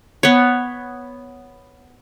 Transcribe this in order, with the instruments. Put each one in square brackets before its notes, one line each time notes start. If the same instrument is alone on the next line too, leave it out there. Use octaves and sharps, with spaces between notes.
[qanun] B3 C#5